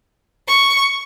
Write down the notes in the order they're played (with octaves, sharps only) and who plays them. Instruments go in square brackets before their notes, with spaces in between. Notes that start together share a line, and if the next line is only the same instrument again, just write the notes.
[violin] C#6